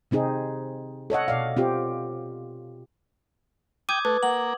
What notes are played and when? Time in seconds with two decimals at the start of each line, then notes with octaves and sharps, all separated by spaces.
0.11 C3 C4 D#4 G#4
1.10 A4 C#5 D#5 F#5
1.28 B2 D5 F5
1.57 C4 F4 G4
3.89 G5 D6 D#6 G6 G#6 D#7
4.05 A3 B4
4.23 A#3 F#5 F#7